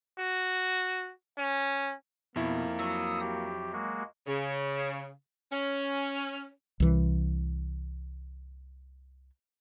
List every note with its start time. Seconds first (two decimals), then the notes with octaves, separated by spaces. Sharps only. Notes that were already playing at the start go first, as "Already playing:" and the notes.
0.19 F#4
1.38 C#4
2.36 F2 B2 A#3 E4
2.79 F#3 D#6 E6
3.20 G4
3.73 G#3 A#3 F#4
4.27 C#3
5.52 C#4
6.80 C2 E3